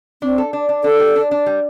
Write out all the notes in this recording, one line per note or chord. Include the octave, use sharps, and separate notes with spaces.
C4 D4
A4
D4
D4
D4 A4
G3
D4
D4
G3